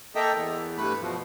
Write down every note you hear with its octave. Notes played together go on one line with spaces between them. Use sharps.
A#3 A4 D#5 E5 G5 A#5
E2
G2 A3 B4
B2 F3